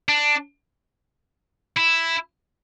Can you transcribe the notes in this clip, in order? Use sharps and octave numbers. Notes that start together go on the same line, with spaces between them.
D4
E4